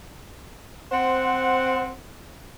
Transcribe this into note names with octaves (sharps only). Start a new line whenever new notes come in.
C4 C5 F#5